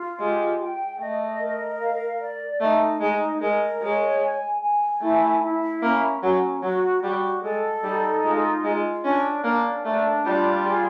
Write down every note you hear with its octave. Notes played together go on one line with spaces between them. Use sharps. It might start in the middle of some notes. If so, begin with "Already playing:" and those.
Already playing: F4
G#3 G4
G5
A3 D#5
A#4
F5
D5
A3 D#4
G#3 D#4
G#3 A#4
G#3 C#5
G#5
G#5
A3 E4
E4
A#3 C#4
F#3 C#4
F#3 F#4
G3 F#4
G#3 A4
G3 D#4
G#3 F4
G#3 F4
C#4 D4
A#3 D4
A3 D4
G3 F4
G#4